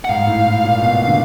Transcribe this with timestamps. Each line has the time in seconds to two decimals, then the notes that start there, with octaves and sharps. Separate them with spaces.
0.05 F#5
0.09 G#2 F5
0.27 A2
0.46 A2
0.64 A#2
0.81 B2
1.07 D3